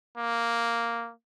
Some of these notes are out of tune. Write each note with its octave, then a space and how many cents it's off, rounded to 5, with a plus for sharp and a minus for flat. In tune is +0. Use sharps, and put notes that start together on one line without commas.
A#3 +0